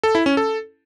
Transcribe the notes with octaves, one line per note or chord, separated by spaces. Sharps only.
A4
E4
C#4
A4